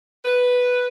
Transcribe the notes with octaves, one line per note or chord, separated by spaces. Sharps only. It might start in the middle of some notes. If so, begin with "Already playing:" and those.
B4